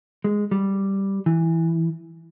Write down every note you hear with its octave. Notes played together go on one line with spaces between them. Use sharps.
G#3
G3
E3